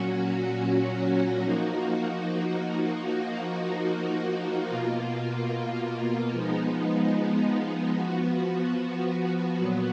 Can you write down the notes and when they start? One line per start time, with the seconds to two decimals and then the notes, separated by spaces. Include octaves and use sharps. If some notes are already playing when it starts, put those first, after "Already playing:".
Already playing: A#2 F#3 C#4 F#4
1.43 F3 A#3 D#4 F#4
3.06 F3 A#3 D#4 F#4
4.69 B2 A#3 F4
6.32 F3 G#3 B3 D#4
7.96 F3 B3 F#4
9.58 A#2 F#3 B3